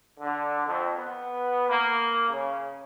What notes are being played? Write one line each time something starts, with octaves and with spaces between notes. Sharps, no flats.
D3
F2
B3
A#3
C#3